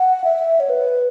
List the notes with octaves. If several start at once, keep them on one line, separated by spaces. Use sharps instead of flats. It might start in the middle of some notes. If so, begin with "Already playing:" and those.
Already playing: F#5
E5
C#5
B4